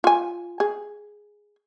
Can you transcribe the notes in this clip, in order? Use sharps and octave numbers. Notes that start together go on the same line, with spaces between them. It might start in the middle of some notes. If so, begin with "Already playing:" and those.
F4 G#5
G#4